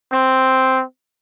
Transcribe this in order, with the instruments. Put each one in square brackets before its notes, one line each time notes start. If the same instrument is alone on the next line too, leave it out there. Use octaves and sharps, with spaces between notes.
[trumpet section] C4